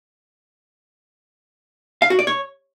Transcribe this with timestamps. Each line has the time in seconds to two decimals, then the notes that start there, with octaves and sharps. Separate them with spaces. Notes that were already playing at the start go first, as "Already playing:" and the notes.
2.02 F5
2.10 F#4
2.19 D5
2.27 C#5